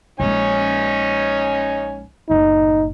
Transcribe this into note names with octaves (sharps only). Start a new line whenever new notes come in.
A#1 G#3 C#4 D#4 G#5
F#1 A2 D#4